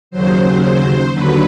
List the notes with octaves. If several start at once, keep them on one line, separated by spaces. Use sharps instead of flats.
D#2 C#3 F#3 C5
C5
D#2 D3 F#3 B4